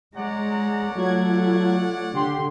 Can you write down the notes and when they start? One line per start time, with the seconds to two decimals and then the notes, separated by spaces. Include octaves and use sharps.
0.16 G#3 C#5 D5 F#5 A#5
0.95 F#3 A3 F4 G#6
2.14 D3 G4 C6